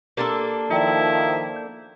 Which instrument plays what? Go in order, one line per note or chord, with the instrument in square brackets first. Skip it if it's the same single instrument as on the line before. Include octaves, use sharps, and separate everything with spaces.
[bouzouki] A#3 D4 A4 [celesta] G4 A#5 C6
[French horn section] D#3 F3 [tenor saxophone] E4 [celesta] D5 G5 A#5
[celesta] G6